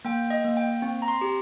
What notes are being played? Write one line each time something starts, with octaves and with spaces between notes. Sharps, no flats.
A#3 G5
D#5
A#3
G5
C4
A#5
C6
G4